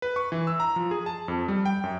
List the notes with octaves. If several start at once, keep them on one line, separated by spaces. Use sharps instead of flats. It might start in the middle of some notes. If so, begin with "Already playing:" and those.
B4
C#6
E3
E6
A#5
F3
G#4
A5
F2
G3
G5
F#2